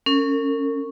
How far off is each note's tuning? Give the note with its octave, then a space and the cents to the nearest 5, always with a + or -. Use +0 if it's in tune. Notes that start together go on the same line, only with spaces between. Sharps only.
C#4 +0 A#4 -40